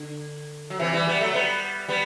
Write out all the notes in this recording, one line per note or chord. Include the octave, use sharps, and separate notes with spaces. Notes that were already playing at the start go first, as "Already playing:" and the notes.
Already playing: D3
F#3
C3 E3
E3 G3
G3 B3
F#3 A3
G3 B3
G3 B3